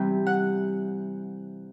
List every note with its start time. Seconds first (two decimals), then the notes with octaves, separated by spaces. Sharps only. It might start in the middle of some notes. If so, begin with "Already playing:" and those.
Already playing: C3 E3 G3 G5
0.27 F#5